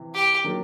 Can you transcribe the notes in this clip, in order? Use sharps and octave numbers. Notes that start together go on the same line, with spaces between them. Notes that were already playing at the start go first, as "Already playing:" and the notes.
Already playing: C3 E3
G4
D#3 F#3 A#3 D4 F4